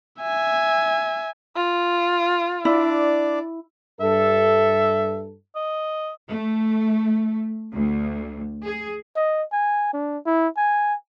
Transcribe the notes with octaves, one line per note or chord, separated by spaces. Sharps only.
E5 G#5
F4
D4 E4 D5
G2 A4 E5
D#5
A3
D2
G#4
D#5
G#5
D4
E4
G#5